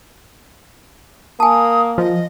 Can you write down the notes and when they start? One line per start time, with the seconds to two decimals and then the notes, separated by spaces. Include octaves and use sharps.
1.40 A#3 G#5 A5 D#6
1.98 F3 D#5